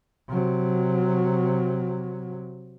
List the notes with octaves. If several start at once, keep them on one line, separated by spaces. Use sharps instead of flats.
C3 F#3